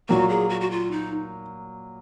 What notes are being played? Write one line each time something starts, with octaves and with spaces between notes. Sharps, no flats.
A#2 F#3 A#3 F#4
G#4
F#4
F#4
F4
D#4